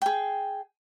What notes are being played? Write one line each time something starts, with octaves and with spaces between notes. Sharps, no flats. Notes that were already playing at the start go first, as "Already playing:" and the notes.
G#4 G5